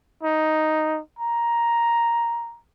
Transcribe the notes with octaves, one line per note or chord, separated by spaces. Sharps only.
D#4
A#5